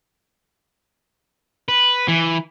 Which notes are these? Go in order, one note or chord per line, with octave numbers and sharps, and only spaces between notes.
B4
E3